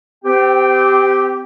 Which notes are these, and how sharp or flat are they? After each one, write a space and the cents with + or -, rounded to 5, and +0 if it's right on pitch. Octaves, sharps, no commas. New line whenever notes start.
C4 -30 G4 +0 G5 +0